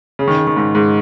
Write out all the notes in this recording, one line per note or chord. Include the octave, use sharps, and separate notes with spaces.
C#3
D#3
C#3
D#3
G#2
G#2